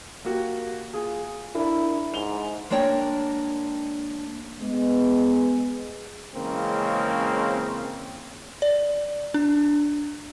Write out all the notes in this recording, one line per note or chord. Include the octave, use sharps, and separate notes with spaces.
A#3 F#4 G4
F4 G#4
D4 E4 A#4
G#2 F7 G7
G#3 A#3 D4 C#5 G5
G#3 B3
C#3 E3 G#3 A#3 C4 C#4
D5
D4